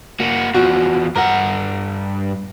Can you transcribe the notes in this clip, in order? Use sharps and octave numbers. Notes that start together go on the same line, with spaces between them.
A#3 F#4
E2 F3 F#4
G2 A#4 F#5